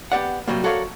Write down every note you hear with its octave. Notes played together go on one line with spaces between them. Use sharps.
B3 G4 D5 F#5
C3 D#3 F#3 G3 A#3
F#4 A4 A#4 C#5 D5 F5